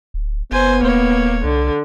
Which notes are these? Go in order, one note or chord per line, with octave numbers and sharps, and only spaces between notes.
D1
F#1 B3 C5 G#5
D#1 A#3 C#5
C2 D3